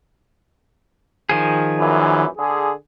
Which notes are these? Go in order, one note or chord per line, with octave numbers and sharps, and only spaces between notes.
D#3 F3 G#4
F#2 A#2 E3
D3 G#4